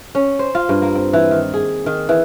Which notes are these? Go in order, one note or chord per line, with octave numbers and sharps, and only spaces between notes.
C#4
C5
F4
G2
A#3
C4
E3
D#3
G#4
D#3
E3